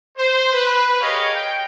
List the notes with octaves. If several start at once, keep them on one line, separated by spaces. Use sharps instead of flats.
C5
B4
G4 G#4 A#4 C#5 D#5 F5
G5